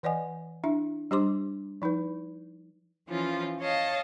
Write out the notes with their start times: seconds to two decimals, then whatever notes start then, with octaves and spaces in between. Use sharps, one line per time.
0.03 E3 B4 D5 D#5 F#5 G#5
0.64 D4 E4 E5
1.11 G3 D4 G4 C5 C6 D6
1.82 F3 D#4 E4 B4
3.08 E3 F3 C#4 F4
3.59 C#5 D#5 F5 A5